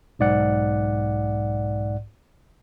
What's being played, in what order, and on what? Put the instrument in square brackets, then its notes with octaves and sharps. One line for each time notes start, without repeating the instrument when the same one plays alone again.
[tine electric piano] B1 G#2 D5 F#5